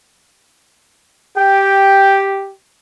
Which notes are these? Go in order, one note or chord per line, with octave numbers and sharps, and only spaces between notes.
G4 G5